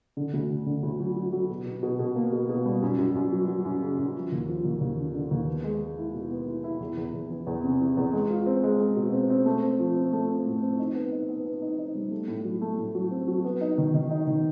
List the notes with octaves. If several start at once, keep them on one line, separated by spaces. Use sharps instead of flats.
D3
D2
D3
D3
D2
F#3
F#3
F#3
B2
B2
B2
B2
A#3
B2
B2
G3
F#2
F#2
F#2
F#3
F#3
F#2
C#3
F#2
F3
D#2
F3
D#2
D#2
D3
D3
D#2
B3
G#3
G#3
E4
B2
B3
E4
E4
E2
E2
E2
E3
E2
C3
E3
E2
G#3
F4
C4
G#3
G#3
B2
C4
C4
A3
C4
F3
C4
A3
C4
A2
C4
D#4
B3
D#4
B3
B3
D#4
D#4
G3
A3
A2
F#3
A3
A2
F#3
C4
F#3
B3
D#4
D#3
D#3
D#4
D#3